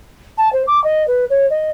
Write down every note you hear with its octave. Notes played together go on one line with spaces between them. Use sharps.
A5
C5
D6
D#5
B4
C#5
D#5